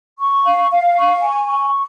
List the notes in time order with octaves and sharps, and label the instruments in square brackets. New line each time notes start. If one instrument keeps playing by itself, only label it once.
[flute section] C#6
F5
F5
C#6
G#5
C#6